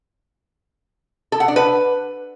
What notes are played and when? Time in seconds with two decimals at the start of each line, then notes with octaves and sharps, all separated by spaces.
1.32 A4
1.40 F#5
1.48 D4
1.56 B4